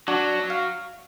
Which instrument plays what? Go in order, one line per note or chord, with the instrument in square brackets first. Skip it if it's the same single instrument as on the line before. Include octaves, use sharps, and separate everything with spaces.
[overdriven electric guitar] F#3 [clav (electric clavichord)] D4 F#4
[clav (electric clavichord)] F5